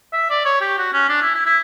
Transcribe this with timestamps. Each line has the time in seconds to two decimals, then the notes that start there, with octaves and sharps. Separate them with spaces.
0.13 E5
0.30 D5
0.45 C#5
0.61 G4
0.78 F#4
0.93 C#4
1.09 D4
1.22 E4
1.34 E4
1.46 E4